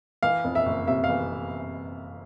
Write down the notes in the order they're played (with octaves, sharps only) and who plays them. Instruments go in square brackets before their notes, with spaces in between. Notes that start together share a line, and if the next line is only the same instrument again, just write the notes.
[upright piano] E3 F5
F2
E5
F#1
C3 E5
F5
E3